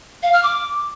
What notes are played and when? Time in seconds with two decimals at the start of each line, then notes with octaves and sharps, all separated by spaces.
0.23 F5
0.33 F6
0.43 D6